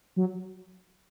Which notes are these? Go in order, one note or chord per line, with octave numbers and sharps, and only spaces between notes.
F#3